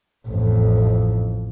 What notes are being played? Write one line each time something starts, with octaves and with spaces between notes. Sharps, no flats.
A1 F2